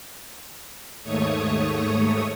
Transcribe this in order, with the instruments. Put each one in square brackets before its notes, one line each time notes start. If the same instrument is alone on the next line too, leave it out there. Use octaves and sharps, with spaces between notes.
[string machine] D#2 G#2 A3 C#5 C#6 D#6